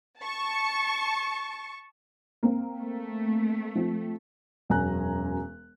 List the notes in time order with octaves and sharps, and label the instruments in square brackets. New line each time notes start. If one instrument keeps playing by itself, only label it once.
[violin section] A5 C#6
[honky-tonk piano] A#3 C4
[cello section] A3
[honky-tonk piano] F3 C4
[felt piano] E1 F#2 C#4 G#5 A#5 F#6